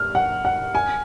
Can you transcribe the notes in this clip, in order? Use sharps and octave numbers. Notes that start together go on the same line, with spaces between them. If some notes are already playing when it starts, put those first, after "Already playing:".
Already playing: F6
F#5
F#5
G#5